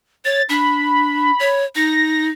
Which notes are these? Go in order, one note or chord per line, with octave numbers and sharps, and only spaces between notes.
C#5 A6
D4 B5
C#5
D#4 A#6